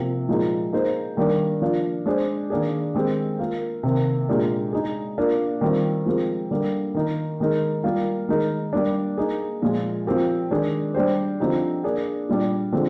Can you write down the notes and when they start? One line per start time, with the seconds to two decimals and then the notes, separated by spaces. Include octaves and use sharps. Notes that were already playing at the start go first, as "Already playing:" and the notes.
Already playing: C3 F3 A#3
0.29 A#2 F3 G#3 D#4 A#4
0.72 A#3 D#4 G#4 C5
1.17 D#3 G3 A#3 D4
1.62 F3 A#3 D4 F4
2.06 G#3 D4 G#4 C5
2.50 D#3 A#3 D4 G#4
2.94 D#3 G#3 C4 G4
3.39 A#3 F4 A#4
3.83 C3 D#3 A#3
4.28 A#2 G#3 D4 G4 A#4
4.73 G#3 D#4 G#4
5.18 A#3 D4 F4 A#4
5.61 D#3 G3 C4 F4
6.06 F3 G#3 C4 G4 A#4
6.51 D3 G3 A#3
6.94 D#3 A#3 D#4 A#4
7.40 D#3 G#3 D#4 A#4
7.84 G3 A#3 F4 A#4
8.28 D#3 G#3 D#4 A#4
8.73 G3 A#3 D4
9.18 A#3 D#4 G#4
9.62 A#2 F3 G#3
10.06 F3 C4 G4 A#4
10.50 D#3 G#3 D4 G#4
10.94 G3 D4 G4 C5
11.40 D3 F3 C4 D#4 G4
11.83 A#3 D4 G#4
12.29 A#2 G3 D4
12.72 D3 F3 G#3 C4